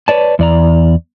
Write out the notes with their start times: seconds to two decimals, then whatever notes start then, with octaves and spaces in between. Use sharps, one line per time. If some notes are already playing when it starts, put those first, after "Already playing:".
0.08 B4 C#5 D5 A5
0.39 E2 D5 A#5